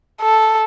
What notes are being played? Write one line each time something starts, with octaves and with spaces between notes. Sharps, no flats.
A4